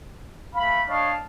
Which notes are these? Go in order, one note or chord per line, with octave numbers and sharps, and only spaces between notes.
A3 F5 B5
D4 C#5 D#5 F5 A5